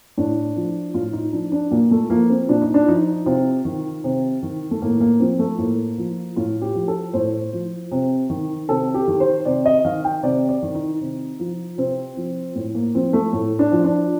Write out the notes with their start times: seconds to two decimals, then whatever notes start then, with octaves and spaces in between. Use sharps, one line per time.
0.17 A2 D4
0.56 F3
0.94 A2 F4
1.13 D#4
1.33 F3 D4
1.52 D4
1.71 A#2 A#3
1.91 A3
2.10 F3 A#3
2.30 C4
2.49 A#2 D4
2.62 D#4
2.74 D4
2.88 F3 D#4
3.26 C3 F4
3.65 D#3
4.04 C3
4.43 D#3
4.71 A3
4.82 A2 A#3
5.00 A#3
5.20 F3 C4
5.39 A3
5.58 A2 A#3
5.98 F3
6.36 A2 F4
6.62 G4
6.75 F3
6.88 A4
7.13 A2 C5
7.53 F3
7.92 C3
8.30 D#3
8.69 C3 A4
8.94 G4
9.08 D#3
9.20 C5
9.45 C3 D5
9.66 D#5
9.85 D#3 F5
10.05 G5
10.23 C3 D5
10.49 D5
10.62 D#3
10.75 D#4
11.01 C3
11.40 F3
11.78 C3 C4
12.17 F3
12.55 A2
12.74 A#3
12.95 F3 C4
13.13 A3
13.33 A2
13.59 D4
13.72 F3
13.84 D4